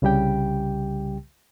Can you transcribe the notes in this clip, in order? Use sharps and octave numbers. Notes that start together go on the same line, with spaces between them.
C2 C#3 G3 G4 G5